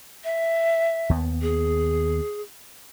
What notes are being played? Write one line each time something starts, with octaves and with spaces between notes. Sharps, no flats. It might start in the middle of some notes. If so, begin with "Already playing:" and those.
E5
D#2 B3
G#4